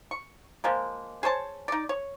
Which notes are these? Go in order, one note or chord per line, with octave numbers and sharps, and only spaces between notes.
C#6
F3 G#3 A#3
G#4 C5 C#5 A5
D#4 D5
C#5